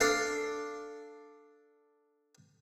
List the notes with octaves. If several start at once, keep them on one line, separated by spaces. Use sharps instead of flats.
D4 A4 F5